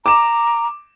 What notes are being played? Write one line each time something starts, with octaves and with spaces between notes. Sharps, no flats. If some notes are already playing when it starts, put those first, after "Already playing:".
A#5 D6 E7